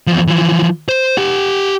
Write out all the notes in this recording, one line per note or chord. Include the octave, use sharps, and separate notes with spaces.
E2 F3
E3 F3
C5
G4 F#5